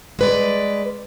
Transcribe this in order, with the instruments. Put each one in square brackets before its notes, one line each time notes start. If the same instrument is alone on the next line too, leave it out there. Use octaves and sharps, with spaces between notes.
[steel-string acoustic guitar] G#3 B4 D5